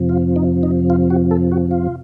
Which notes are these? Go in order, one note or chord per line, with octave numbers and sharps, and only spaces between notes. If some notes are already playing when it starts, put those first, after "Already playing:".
Already playing: F2 C3 F3
F4
D#4
D#4
F4
F#4
A4
F#4
F4